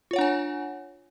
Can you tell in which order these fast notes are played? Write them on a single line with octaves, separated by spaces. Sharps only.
F4 C#5 F#5 D4 G#5